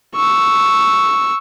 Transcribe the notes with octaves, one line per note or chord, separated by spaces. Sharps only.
C#6 E6